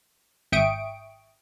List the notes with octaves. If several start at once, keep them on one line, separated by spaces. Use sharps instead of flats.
G#1 E5 G5 C#6 D#6 D7